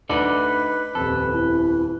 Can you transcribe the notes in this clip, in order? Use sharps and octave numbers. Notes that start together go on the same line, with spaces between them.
D2 D#4 A4 B4 D5 D6 F#7
D#1 F2 A4
E4